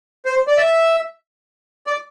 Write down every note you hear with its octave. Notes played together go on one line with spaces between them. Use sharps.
C5
D5
E5
D5